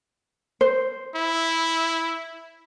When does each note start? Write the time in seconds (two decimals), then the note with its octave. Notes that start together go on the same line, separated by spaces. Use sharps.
0.61 C5
1.16 E4